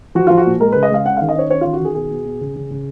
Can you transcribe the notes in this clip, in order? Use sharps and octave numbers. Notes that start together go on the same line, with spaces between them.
F3 F#4
F3 F4
F#4
A#2
G#3 A#4
C#3 B4
D#5
G#3 F5
C#4 F#5
D#3 F5
D#5
C#4 C#5
C#4 C#5
D#3 F4
F#4
D#3 G#4
B2 G#4
B2
B2
C#3
C#3
C#3